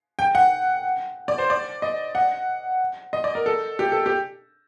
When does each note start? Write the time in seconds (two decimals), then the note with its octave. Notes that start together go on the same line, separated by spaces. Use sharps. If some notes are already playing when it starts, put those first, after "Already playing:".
0.19 G5
0.35 F#5
1.28 D5
1.38 C5
1.50 D5
1.82 D#5
2.15 F#5
3.13 D#5
3.24 D5
3.35 A#4
3.46 A4
3.79 G4
3.92 A4
4.06 G4